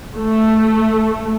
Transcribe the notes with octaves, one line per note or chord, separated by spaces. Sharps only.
A3